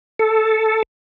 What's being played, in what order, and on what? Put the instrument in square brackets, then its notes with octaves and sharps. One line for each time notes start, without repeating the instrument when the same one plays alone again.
[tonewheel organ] A4